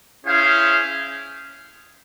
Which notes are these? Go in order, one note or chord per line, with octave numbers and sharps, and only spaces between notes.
C#4 E4 G#4 C5 F5